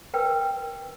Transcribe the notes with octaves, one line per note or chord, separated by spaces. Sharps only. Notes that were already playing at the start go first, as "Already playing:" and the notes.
A#4 B4 G5